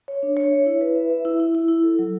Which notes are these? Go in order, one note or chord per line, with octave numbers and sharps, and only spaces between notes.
C#5
D4
C#5
E5
E4
B4
E5
E5
E4
E4
E4
E4
A4
F#3